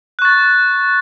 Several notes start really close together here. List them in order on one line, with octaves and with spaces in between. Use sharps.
F#6 C#6 A6